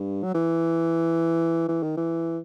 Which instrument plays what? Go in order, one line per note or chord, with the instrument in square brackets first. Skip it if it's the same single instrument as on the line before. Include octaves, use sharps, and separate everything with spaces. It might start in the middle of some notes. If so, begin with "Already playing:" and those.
Already playing: [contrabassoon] G2
F#3
E3
E3
D#3
E3